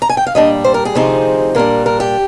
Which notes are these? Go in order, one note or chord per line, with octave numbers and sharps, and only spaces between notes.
A#5
G#5
G5
F5
A#2 G3 D4 D#5
C5
A#4
G#4
D2 C3 F3 C4 D#4
A#2 G3 D4 A#4
A#4
G4